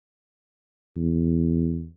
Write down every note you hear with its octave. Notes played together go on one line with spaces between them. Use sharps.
E2